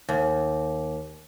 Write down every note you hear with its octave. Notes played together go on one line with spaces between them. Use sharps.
D#2